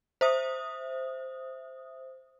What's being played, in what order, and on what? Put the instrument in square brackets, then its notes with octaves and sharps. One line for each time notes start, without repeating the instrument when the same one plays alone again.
[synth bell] C5 E5 D#6